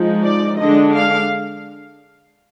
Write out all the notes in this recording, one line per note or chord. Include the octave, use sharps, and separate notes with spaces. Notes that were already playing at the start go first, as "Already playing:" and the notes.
Already playing: F3 G#3 D#4
D5
D3 G#3 D4 D#5
F5